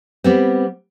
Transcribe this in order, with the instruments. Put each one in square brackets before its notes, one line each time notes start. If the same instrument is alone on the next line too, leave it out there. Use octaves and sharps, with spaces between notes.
[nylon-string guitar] G3 B3 C4